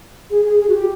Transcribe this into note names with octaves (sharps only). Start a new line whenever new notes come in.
G#4
G#4
G#4
F#4
G4